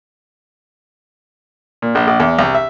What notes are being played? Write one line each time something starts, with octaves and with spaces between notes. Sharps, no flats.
A#2
A#1
A#1
E2
C2
E5